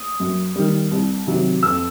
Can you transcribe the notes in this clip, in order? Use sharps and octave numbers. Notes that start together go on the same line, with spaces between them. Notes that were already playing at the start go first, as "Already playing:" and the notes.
Already playing: D#6
F#2
D#3 G3
C2
C3 D#3 F#3
F2 E6